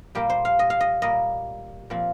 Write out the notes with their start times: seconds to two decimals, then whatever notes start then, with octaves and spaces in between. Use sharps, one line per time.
0.15 A#2 G3 A#3 G4
0.30 C5
0.45 F5
0.59 D#5
0.70 F5
0.80 D#5
1.02 A#2 G3 A#3 D#5
1.90 A#2 F3 C4